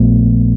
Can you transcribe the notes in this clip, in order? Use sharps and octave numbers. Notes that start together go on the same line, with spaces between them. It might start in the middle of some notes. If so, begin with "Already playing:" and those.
Already playing: A#1 A#2 F3 A3 B3